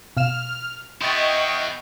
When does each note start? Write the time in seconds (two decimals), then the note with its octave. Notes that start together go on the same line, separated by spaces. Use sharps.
0.17 B2 F5 F6 E7
1.01 B3 E4 D#5 G5 C6 C#6 A6